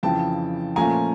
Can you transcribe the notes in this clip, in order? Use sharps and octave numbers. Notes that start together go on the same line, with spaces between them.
F2 C#3 E3 G5 A5
A#2 F3 A3 C#4 G#5 A#5